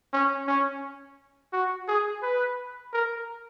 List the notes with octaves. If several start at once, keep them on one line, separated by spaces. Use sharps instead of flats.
C#4
C#4
F#4
G#4
B4
A#4